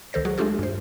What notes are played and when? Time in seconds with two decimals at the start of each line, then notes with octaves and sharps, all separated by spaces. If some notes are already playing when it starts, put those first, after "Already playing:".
0.13 C#2 D#3 A4 C5 A#6
0.25 F#3 F#4 G#4
0.38 G#3 A3 D4 F4 G4 A4
0.59 G2 C5